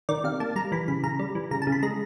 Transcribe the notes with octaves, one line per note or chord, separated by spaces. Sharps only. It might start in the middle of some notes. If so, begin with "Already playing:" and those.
D#3 D5
C3 F5
A#3 A5
G3 A#5
E3 B5
C#3 B5
C#3 A#5
G3
E3
C#3 A#5
A5
C#3
B5
G#3 A#5